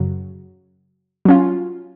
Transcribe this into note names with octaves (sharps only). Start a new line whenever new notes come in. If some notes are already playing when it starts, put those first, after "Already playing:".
Already playing: F#2 C#3 F#3
F#3 C#4 F4